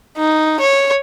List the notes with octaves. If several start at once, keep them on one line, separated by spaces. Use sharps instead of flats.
D#4
C#5